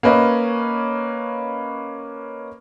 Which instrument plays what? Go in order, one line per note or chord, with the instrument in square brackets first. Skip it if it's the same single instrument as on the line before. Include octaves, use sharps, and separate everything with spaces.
[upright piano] A#3 C#4 B4 D#5